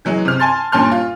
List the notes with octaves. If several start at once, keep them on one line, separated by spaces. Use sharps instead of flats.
E3 F#3 G#3
C3 F6
G#5 A5 C6 A6
G2 A#2 C#4 A5 C6 F6
F4